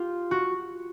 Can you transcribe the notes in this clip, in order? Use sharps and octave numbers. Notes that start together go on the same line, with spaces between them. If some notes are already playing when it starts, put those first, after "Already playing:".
Already playing: F4 G4
F#4